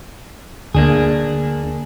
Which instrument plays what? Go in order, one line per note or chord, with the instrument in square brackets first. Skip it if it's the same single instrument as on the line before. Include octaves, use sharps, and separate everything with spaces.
[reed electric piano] D2 [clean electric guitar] A#3 D4 G#4